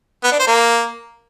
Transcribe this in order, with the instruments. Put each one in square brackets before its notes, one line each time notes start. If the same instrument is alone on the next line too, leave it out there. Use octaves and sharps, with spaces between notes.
[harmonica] B3
D4
C5
A#3